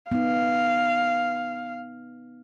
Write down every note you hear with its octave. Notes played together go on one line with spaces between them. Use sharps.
B3 D#4 F5